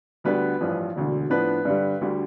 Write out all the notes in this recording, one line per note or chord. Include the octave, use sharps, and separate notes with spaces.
D2 D3 G3 B3 B4
A1 G2 F3
E1 D2 D3
A2 F3 B3 D4 B4
G2 D3 G3
D2 D3 G3